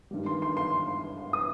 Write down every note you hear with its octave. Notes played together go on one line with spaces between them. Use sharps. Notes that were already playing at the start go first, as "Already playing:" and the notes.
G2 D#3 G3
C6
C6
C6
D#6